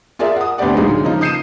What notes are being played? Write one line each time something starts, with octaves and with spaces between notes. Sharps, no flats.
F4 G#4 A#4 D5 E5
F#5 D#6
D2 B3 C4 G4 D5 F#5
A#2 D3 F#3 G#3 D#4
C#3 F3 A#3 D#4
D#6 G6 C7 C#7 D#7 E7